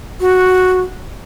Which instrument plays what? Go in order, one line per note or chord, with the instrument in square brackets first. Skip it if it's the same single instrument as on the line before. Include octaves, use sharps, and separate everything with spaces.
[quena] F#4